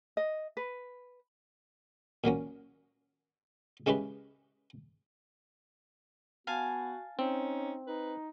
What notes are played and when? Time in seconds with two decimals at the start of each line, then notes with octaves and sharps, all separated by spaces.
0.17 D#5
0.57 B4
2.24 A#2 F#3 A#3 C#4
3.86 C#3 G#3 C#4 E4 G4 B4
6.47 B3 F#4 F5 G#5 A5
7.19 C4 C#4 D#4
7.87 D#4 B4